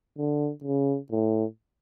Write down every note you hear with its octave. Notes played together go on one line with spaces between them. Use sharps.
D3
C#3
A2